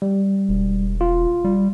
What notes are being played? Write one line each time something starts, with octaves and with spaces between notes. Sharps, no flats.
G3
E1
F4
G3